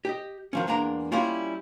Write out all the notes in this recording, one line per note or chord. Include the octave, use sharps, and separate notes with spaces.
G4 D#5
D#3 F3 C#4
E2 G#3 A#3 D4 A#5
G3 A#3 C#4 E4 F4